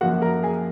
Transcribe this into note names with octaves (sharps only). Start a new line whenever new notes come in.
F#2 F3 A#3 F#4 F#5
A#4 A#5
G#4 G#5